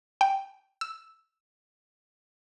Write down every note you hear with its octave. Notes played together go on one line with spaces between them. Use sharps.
G5
E6